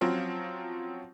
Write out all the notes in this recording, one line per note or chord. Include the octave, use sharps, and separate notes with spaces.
F3 F#3 C4 C#4 F4